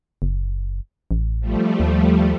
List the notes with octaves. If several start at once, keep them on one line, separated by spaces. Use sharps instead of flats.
F#1
A1
F3 G3 A3
D#2